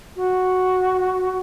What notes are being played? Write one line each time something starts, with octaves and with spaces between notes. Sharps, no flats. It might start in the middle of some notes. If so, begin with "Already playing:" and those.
F#4